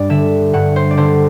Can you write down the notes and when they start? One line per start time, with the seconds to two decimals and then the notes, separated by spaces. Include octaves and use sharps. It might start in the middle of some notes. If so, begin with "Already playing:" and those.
Already playing: G2 D5
0.10 D3 E5
0.53 G2 F#5
0.76 C5
0.91 D5
0.97 D3 C5